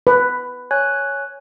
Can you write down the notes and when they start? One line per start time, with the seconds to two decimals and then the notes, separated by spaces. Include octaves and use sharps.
0.07 B4
0.71 C#5 G#5 F#6